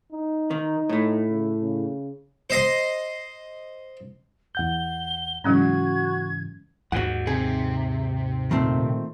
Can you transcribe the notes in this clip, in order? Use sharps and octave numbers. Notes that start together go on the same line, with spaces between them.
D#4
D#3
A2 A3
C#3
C#3
C5 D#5 C6
E2 F#5 G6 G7
G#2 C#3 E3 F#3 G#3 C#4 F#4 G#6
D#2 G#2 F#4 F#5
C3 G#4
A#2 D#3 A3 C4